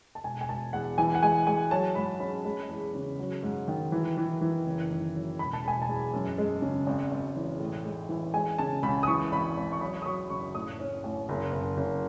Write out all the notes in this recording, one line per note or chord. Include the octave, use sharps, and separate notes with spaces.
A5
E1 G#5
G#5
E1 A5
E2 F#5
E3 G#5
F#5
G#3 G#5
G#3 G#5
F#3 A5
G#2 B5
C#4 B5
G#3
E2
C#3
F#3
G#2
D#3
E3
E3
E3
F#1
D#3
F#3
E1 B5
A5
E1 G#5
A5
E2
F#2
G#3
C#3
G#1
G#1
E3
A2
G#3
E3
G#3 G#5
C#3 A5
C#2 B5
D#6
E3 C#6
G#1 B5
G#1
C#6
F#3 B5
D#6
F#3 C#6
F#1 C#6
A2 D#6
C#4
A1
F#1
F#1
F#1